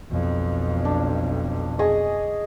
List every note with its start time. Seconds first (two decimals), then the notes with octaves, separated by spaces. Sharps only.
0.11 B1 F2
0.85 D4
1.79 G#4 D#5 C#6